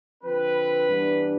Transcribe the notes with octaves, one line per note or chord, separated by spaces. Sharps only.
D3 F3 C4 B4
G2 E3 G3 B3 D4